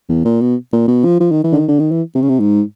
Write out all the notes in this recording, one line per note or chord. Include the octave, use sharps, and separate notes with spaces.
E2
A#2
B2
A#2
B2
F3
F3
D#3
E3
D3
D#3
D3
D#3
E3
C3
C#3
C3
G#2